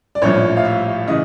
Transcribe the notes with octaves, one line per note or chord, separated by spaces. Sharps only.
D5
A#1 A2 F3 C#5
F5
E5
C#3 E3 D#5